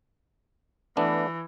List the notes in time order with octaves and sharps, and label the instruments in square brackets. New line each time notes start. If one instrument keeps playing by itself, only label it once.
[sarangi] E3 [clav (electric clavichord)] A3 B3 D4